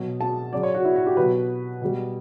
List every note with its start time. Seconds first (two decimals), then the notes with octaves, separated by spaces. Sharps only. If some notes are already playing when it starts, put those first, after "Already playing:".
Already playing: B2 F#3
0.21 A5
0.53 C#3 F#3 D5
0.63 C#5
0.74 F#4
0.85 E4
0.96 F#4
1.07 G4
1.17 B2 F#3 B4
1.82 B2 G3